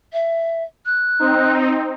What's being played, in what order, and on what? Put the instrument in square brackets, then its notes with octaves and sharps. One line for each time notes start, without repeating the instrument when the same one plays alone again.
[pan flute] E5
F#6
[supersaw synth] C4 D#4